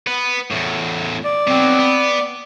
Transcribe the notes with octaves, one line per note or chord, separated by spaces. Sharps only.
B3
E2 A2
D5
B2 F#3 C4
B3